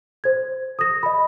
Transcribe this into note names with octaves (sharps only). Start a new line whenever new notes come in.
C5 G#6
D#6 A#6
D#5 B5